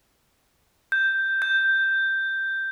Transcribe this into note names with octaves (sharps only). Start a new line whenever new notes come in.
G6
G6